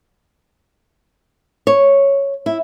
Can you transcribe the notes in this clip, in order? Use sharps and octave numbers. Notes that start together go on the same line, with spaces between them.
C#5
E4